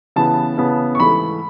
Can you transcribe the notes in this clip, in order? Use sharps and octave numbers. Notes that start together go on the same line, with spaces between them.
C#3 E3 B3 A5
C#3 E3 B3
C#6
G#2 E3 A3 B5